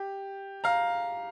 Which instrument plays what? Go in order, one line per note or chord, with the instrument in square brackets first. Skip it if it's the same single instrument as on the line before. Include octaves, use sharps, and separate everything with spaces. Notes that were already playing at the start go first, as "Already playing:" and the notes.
Already playing: [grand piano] G4
F5 A#5